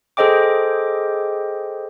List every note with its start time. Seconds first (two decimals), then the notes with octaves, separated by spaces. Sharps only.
0.17 G#4 A4 C5 D#5 G5 D6